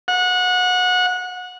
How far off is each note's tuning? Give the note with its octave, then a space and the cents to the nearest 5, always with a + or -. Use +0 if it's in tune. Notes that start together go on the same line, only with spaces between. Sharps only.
F#5 -25